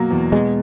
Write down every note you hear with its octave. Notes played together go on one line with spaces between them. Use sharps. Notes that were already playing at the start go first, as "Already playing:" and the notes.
Already playing: B2 F#3 A#3
E2
B2 G#3